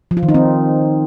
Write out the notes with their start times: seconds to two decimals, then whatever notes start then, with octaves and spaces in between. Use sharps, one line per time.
0.11 F3
0.17 F4
0.23 D#3
0.29 D#4
0.34 C4